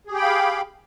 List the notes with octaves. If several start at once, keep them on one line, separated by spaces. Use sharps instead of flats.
G4 G#4 F5 G5 B5